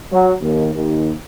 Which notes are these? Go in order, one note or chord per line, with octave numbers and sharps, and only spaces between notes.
F#3
D#2
D#2